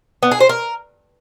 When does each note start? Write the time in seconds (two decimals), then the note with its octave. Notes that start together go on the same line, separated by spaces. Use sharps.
0.23 B3
0.31 G#4
0.40 C5
0.49 A#4